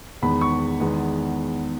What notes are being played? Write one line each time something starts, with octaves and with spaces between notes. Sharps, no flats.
E2 D#3 G#3 B3 B5
C#6
E2 D#3 G#3 B3